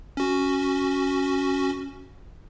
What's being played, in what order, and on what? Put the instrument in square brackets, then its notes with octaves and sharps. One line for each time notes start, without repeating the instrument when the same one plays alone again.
[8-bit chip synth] C#4 F#4